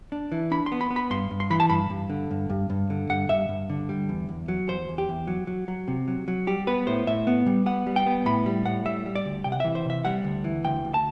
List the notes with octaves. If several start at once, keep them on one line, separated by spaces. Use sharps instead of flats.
D4
E3
D4 B5
C6
B3
B5
B3
B5
G2 C6
G2
C6
E3 B5
A5
G2 B5
G2
D3
G2
G2
G2
D3
G2 F#5
G2 E5
G2
D3
G3
E2
E2
F#3
E2 C5
E2
G4
E2
F#3
F#3
F#3
C3
F#3
F#3
G3 G4
B3 B4
A2 C5
A2 E5
B3
G3
B3 F#5
G3
G5
B3
A2 B5
G3
A2 F#5
G3 E5
G3
D5
D2
C3 G5
F#5
E3 E5
C5
C3 E5
G3 F#5
D2
E3
D2 G5
D2
A5